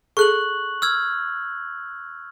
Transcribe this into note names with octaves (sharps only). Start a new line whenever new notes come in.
G#4 A4 C#6 F#6 F#7
E6 F6 G#6